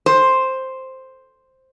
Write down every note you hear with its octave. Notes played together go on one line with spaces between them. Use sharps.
C5